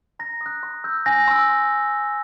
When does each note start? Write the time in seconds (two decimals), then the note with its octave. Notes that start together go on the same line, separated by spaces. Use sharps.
0.19 A#5 A#6
0.41 D#6 F#6
0.63 C6
0.84 E6 G6
1.06 G#5 A#6
1.28 C6 E6